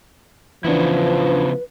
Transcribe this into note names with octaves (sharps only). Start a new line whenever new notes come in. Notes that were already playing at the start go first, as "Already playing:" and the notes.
C#3 E3 F3 B3 D4 E4 B4